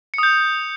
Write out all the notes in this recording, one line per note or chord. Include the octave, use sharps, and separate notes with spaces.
D#6 G6 C#7